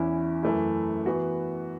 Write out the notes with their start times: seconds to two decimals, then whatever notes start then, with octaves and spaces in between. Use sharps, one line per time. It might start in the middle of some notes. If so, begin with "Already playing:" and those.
Already playing: E2 E3 C#4 E4
0.43 F#2 E3 A3 E4
1.06 E3 B3 F#4